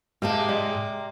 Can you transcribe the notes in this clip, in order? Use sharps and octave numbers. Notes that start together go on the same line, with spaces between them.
G#2 C3 G#3 A#3 G4 F5 A5
D5 D#5